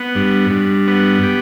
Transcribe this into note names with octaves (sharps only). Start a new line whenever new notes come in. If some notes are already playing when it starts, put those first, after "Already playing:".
Already playing: B3
G2
G2
B3
G4